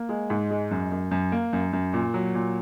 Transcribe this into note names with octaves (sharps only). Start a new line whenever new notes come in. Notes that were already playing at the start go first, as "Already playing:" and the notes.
Already playing: A#3
G#3
G#2
G#3
F#2
F#2
F#2
A#3
F#2
F#2
A#2
F#3
A#2